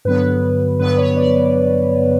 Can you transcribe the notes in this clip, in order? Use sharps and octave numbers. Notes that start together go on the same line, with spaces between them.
G2 D3 F#3 B3 B4
G2 D3 F#3 B3 B4
C#5
D5